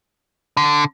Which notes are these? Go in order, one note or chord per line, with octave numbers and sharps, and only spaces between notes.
D3